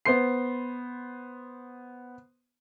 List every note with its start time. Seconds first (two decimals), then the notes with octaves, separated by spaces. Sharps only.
0.05 B3 C5 C6 C7